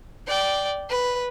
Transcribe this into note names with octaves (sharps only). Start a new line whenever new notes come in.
D5 G5
B4